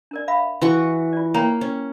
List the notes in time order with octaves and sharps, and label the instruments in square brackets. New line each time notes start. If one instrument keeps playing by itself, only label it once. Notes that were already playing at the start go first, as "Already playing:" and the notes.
[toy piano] D4 A#4 D5
E5 F5 B5
[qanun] E3 F#4 C#6 [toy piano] C6
[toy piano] F4 D5
[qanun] A#3 [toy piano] C#5 G5 A#5
[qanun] C#4